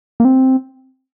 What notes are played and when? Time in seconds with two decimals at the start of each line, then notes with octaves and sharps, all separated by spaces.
0.20 A#3
0.25 C4